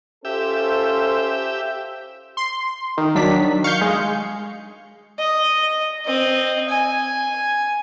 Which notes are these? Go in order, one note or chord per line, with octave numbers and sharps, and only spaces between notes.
C#4 F4 G4 A4 C5 E5
C6
D#3
F#3 D4 B6
F5 C#6 G6
G#3
D#5
C4 D#5
G#5